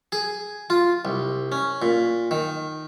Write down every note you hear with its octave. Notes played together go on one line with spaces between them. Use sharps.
G#4
F4
C2
C#4
A#2
D#3